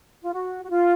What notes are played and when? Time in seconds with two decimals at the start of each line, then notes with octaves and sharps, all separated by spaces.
0.22 F4
0.33 F#4
0.64 F#4
0.70 F4